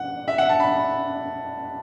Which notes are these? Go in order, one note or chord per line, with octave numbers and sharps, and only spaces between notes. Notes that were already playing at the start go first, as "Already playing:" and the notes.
Already playing: F#5
E5
F#5
A5
B5